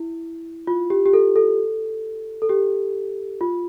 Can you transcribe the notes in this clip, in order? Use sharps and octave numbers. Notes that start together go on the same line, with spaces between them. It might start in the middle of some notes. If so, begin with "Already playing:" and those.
Already playing: E4
F4
G4
G4
A4
A4
A4
G4
F4